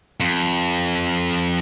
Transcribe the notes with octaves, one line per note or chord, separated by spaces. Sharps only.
F2